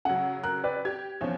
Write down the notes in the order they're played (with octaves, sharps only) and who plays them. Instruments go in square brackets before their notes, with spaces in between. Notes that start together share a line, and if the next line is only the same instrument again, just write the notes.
[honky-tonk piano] C#3 F#3 [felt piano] F#5
[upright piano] A#4 [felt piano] F#6
[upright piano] B4 D5 G5
[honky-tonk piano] G4 [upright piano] G#6
[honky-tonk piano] E2 [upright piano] F3 C#4 C#5